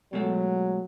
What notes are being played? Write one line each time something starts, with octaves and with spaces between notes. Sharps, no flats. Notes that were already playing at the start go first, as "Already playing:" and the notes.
B2 F#3 G#3 A3